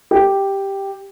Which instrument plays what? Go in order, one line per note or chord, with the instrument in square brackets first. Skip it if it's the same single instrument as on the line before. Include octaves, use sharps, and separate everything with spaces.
[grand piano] G4